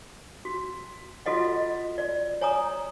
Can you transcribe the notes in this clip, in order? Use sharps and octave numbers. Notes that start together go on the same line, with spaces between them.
F#4
F4 F#4 A4 D#5 F#5
D5
C#5 G#5 A#5 D#6